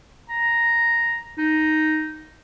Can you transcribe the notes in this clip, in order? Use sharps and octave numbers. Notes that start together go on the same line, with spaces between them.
A#5
D#4